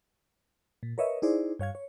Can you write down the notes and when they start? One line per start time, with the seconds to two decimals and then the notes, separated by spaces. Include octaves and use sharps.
0.83 A#2
0.98 A#4 B4 C#5 D#5 E5
1.22 D#4 E4 G#4 C5 D5
1.59 G2 C#5 F5 G#6
1.75 C#5